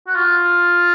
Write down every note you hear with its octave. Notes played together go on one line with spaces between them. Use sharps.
F#4
F4